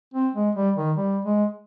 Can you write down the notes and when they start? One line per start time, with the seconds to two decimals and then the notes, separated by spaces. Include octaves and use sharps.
0.14 C4
0.35 G#3
0.55 G3
0.76 D#3
0.97 G3
1.25 G#3